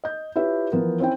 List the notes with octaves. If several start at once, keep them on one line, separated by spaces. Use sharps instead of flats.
D#5 G6
E4 F4 G4 B4 C#5 E5
E3 F3 B3 A#4
C4 C#4 E4 G5